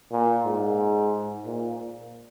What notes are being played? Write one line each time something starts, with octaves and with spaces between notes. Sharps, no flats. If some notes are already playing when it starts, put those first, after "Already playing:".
A#2
G#2
A#2